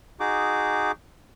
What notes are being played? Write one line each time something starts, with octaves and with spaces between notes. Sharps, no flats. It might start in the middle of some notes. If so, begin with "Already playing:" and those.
D#4 F#4 G#4 D6